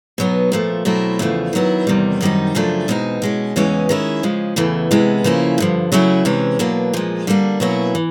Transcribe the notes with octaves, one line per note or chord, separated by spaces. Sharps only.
B2 F#3 B3 D#4
A#2 F3 A3
B2 F#3 A3 C4 E4
E2 C#3 F3 A3
D#3 F#3 B3 E4
E2 C3 D#3 G3
F#2 D#3 G3 C4 D#4
F#2 C#3 F3 A3 D4
E2 B2 G#3 C4 D#4
B2 G#3 C#4
E2 C#3 E3 G#3 C#4
D#3 G#3 C#4 E4
C#3 F3 G#3
E2 C#3 E3 A3
C3 E3 G#3 B3
C#3 F3 A#3 C#4 E4
G2 D3 F3
C#3 F#3 A3 C#4 E4
C3 E3 G#3 C#4
B2 F#3 A#3 D4
A#2 F3 G#3
D3 G3 A#3 D4
B2 F#3 A#3 C#4 E4
E3